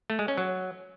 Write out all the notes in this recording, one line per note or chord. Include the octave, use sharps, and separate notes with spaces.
A3
G#3
C#4
F#3